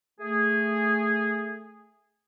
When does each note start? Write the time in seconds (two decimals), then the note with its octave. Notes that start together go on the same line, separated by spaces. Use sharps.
0.20 A3 G#4